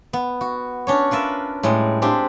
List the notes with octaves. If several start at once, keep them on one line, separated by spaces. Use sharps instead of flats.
B3
F#4
C#4 D4 C#5
F4 A#4 B4 E5
A2 G3 G#3
G#3 C4 D4 G4 F5